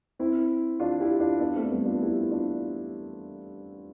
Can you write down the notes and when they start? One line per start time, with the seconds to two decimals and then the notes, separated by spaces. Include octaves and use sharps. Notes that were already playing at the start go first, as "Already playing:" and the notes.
0.19 C4 E4
0.80 D4 F4
1.00 E4 G4
1.20 D4 F4
1.40 B3 D4
1.55 A3 C4
1.71 G3 B3
1.85 D4 F4
2.01 E4 G4
2.31 D4 F4